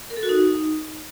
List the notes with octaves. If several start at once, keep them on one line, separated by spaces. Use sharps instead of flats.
A#4
A4
F#4
D#4